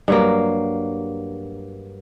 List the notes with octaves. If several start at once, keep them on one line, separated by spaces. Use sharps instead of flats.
G2 F#3 A#3